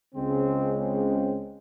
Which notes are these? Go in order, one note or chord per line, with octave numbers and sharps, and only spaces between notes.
C#2 C#3 G#3 C4
C4